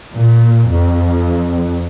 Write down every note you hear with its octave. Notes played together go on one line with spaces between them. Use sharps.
A#2
F2